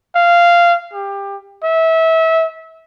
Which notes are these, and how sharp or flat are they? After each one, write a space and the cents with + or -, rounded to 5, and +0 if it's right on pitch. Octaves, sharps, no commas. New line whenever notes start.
F5 -15
G4 +20
E5 -25